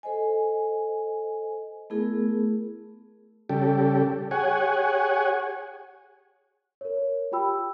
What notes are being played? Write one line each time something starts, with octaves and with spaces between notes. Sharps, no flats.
A4 C5 D#5 G#5
A3 B3 E4 G#4 A#4
C#3 G3 G4 A4
G4 G#4 C#5 F#5 G#5
A#4 C#5
F4 G4 G5 B5 E6